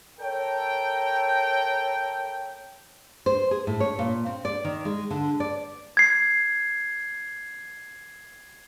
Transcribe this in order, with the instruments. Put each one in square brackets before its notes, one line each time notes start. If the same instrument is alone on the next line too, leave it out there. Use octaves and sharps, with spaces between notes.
[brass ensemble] A4 A#4 C#5 G5
[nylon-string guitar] C5
G#4
A2
C#5
A#2
C4
D5
D#3
G#3
D3
D5
[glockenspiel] G#6 C7